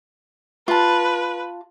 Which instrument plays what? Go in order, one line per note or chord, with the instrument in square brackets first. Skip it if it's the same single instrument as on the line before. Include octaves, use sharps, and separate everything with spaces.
[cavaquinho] F4 A5 [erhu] B4